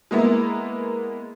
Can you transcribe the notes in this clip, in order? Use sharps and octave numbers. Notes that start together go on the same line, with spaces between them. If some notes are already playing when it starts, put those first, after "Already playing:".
G#3 A#3 B3 E4